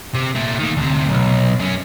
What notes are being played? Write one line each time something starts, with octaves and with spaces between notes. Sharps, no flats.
C3
A#2 A3
D#3 A#3
D2 C3
B1
F#2 C#4